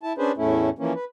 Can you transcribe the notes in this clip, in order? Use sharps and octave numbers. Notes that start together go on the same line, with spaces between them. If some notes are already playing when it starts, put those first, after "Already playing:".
E4 A5
C#4 D4 G#4 B4 C5
E2 A2 A3 C#4 E4
E3 F3 A#3 C#4
B4